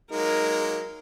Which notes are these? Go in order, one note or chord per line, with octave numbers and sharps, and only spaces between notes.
F#3 G#3 A#3 D#4 A#4